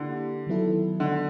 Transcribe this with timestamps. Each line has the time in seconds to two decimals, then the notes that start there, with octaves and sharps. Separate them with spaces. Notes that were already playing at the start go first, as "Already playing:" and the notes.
Already playing: D3 A#3 E4 G4
0.47 D#3 F#3 B3 E4 A4
1.00 D3